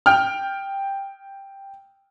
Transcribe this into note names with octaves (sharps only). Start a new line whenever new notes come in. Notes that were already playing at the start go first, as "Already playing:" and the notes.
G5 F6